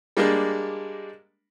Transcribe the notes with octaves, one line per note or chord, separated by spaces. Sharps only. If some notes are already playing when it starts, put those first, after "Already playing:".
G3 G#3 A#3 D4